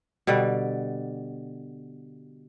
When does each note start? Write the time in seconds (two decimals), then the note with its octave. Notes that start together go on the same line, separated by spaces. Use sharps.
0.27 B2 D3 G3